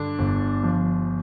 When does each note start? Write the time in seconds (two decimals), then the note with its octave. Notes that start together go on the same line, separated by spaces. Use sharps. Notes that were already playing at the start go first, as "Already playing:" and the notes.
Already playing: G2 D3 D4
0.19 G1
0.63 F3